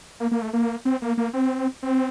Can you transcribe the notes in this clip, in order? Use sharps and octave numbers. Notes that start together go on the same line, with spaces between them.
A#3
A#3
A3
A#3
C4
A#3
A#3
C4
C4